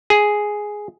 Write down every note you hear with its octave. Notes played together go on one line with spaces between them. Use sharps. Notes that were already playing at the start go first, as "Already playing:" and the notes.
G#4